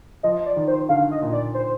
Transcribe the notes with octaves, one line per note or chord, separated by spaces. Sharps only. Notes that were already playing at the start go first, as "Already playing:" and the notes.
F3 D#5
D5
D#3
C5
D3 F5
D#5
A#2
D5
C5